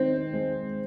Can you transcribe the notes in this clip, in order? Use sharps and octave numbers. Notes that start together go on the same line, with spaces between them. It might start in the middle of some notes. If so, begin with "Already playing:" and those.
Already playing: D#3 G#3 C4 D#4
D#4
G#3